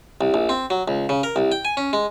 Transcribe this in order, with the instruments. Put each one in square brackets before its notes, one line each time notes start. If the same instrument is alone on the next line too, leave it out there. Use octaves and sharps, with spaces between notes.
[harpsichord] C2
A#1
C4
F#3
C#2
C#3
A#4
C2
G5
G#5
C#4
G#3